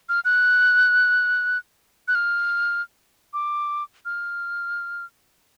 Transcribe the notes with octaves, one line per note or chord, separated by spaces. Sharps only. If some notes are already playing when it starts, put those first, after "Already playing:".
F6
F#6
F#6
F6
D6
F6